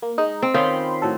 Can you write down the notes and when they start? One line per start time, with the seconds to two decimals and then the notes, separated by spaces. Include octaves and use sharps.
0.02 A#3
0.18 G#3 D#4
0.42 C4
0.54 D#3 C#4 F4 C5 B5 C6
1.02 A2 F#3 A4